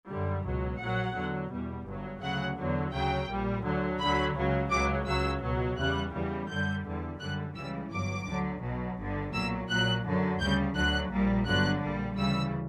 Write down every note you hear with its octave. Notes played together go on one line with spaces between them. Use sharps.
F#2 D3 G3
C#2 B2 F#3
A#1 A#2 F#3 F#5
E2 D3 F#3
E2 B2 G3
G1 G2 F#3
D2 C#3 F#3 F#5
E2 D3 F#3
D2 C#3 F#3 G5
A#1 A#2 G3
D2 D3 F#3
D2 D3 F#3 B5
C#2 C#3 F#3
C#2 C#3 F#3 D6
C#2 C#3 F#3 E6
C#2 B2 F#3
E2 C#3 G3 F#6
E2 C#3 E3 G3
F#2 D3 G3 G6
E2 D3 G3
F#2 D3 G3 F#6
C#2 C#3 E3 G3 E6
G1 G2 F#3 D6
D2 D3 F#3
B1 B2 F#3
G1 G2 D3
B1 A#2 F#3 E6
A#1 A#2 F#3 F#6
F#2 D3 F#3
D2 C#3 G3 G6
D2 D3 F#3 F#6
A#1 A#2 G3
G1 G2 D3 F#3 F#6
A#1 A#2 G3
D2 C#3 E3 G3 E6